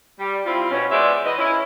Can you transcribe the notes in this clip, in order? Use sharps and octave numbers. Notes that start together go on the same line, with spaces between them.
G3
G3 C4 E4 F4
B2 C#4
G#3 B3 C5 D5 E5
E3 B3 B4 D#5
C#4 E4